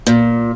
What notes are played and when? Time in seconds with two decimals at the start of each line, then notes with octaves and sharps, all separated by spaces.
0.07 A#2